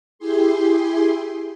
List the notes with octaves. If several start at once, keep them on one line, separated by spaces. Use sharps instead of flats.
E4 G4 G#4 C6